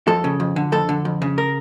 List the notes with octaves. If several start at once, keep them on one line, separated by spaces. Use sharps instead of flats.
F2 A4
C#3
F2
D3
F2 A4
D3
F2
C#3
A#4